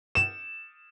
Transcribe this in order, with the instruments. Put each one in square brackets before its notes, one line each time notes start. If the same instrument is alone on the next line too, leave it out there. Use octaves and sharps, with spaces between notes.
[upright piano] E7